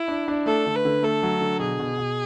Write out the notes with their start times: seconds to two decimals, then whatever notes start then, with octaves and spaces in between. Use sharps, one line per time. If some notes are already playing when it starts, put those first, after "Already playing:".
Already playing: E4
0.08 D4
0.28 D4
0.46 A3 A4
0.66 D3
0.75 B4
0.85 D3
1.03 A3 A4
1.23 F#3
1.41 D3
1.60 B2 G#4
1.79 B2
1.98 B2